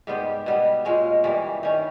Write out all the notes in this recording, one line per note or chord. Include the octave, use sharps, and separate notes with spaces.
G#2 G3 B3 G4
B2 G3 B3
A#2 G#3 C#4
G2 E3 G3
D#3 G3 C#4